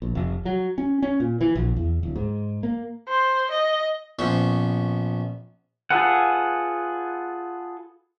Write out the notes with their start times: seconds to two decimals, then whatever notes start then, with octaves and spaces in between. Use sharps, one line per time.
0.02 A#1
0.15 F1
0.45 F#3
0.78 C#4
1.02 C#4
1.20 A#2
1.41 E3
1.56 A#1
1.77 E2
2.03 D1
2.16 G#2
2.63 A#3
3.09 C5
3.51 D#5
4.19 A#1 B3 C#4 C5
5.90 F4 G#4 A4 B4 F#5